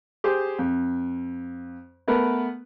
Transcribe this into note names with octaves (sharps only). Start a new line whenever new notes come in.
G4 G#4 C5
F2
A3 B3 A#4 B4